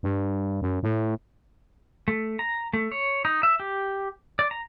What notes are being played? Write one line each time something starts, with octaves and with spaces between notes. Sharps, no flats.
G2
F#2
A2
A3
A#5
A3
C#5
D#4
E5
G4
D5
A#5